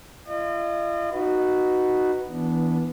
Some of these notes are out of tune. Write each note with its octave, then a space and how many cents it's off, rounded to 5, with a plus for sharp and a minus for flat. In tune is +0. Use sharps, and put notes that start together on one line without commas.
F4 -45 D#5 -40
D#4 -10 F#4 +0 B4 +0
E3 -20 B3 +0 D4 -15